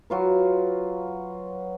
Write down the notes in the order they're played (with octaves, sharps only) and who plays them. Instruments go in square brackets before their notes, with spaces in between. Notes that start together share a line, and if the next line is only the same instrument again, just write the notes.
[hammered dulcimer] F#3 F4 B4